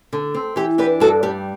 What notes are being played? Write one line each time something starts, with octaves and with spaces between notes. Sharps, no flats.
D3
C4
E3 G4
D4 G4 B4
G2 F#4 A4
G3 G4